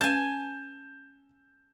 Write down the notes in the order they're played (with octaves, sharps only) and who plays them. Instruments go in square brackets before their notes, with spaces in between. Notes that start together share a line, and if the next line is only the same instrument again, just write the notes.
[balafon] C#4 B4 F5 [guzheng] G#5 A5 [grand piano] G6 E7